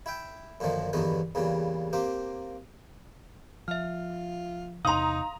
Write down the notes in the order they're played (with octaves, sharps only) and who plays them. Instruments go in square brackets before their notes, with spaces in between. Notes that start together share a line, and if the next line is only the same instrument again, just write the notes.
[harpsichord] E4 E5 G5
F#2 A#2 D3 D#3 F3
E2 G2 D3 D#3 F#3 B3
E2 A#2 C#3 G3
A#3 C4 G4
[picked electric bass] F3 [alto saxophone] F4 [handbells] E5 F6
[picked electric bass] E2 C3 [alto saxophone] D#4 [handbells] F5 C6 [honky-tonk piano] A#5 D#6